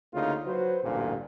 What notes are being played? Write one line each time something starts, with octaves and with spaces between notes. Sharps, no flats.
D2 C#3 A#3 D#4 F4
F#3 F#4 B4 C5
A1 D2 G2 A#2